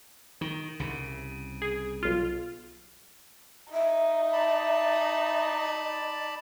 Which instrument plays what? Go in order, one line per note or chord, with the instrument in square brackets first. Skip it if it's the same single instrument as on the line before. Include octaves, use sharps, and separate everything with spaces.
[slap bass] D#3
C2 C#3
[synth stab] G#4
B1 F4
[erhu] D#4 [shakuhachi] E5
[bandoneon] D5 A5 B5